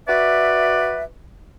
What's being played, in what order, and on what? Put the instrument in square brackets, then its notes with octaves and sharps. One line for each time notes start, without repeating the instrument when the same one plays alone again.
[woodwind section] F#4 B4 D5 E5